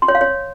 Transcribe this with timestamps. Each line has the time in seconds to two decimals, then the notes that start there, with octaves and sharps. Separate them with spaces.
0.02 C6
0.08 C#5
0.15 F5
0.21 C#5